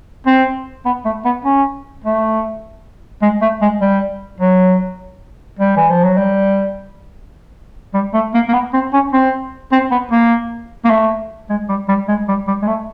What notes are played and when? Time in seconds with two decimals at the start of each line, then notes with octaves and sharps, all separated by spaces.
0.26 C4
0.86 B3
1.05 A3
1.25 B3
1.45 C#4
2.04 A3
3.22 G#3
3.42 A3
3.61 G#3
3.81 G3
4.40 F#3
5.59 G3
5.77 E3
5.90 F3
6.04 F#3
6.17 G3
7.94 G3
8.14 A3
8.34 A#3
8.49 A#3
8.54 B3
8.73 C4
8.93 C#4
9.13 C4
9.72 C4
9.91 B3
10.11 A#3
10.85 A#3
10.90 A3
11.50 G#3
11.69 G3
11.88 G3
12.08 G#3
12.28 G3
12.47 G3
12.62 G#3
12.67 A3